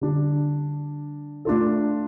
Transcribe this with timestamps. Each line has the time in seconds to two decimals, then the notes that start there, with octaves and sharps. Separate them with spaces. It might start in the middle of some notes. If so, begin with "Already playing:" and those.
0.01 D3 G3 D4
1.45 A3 D4 F4 A4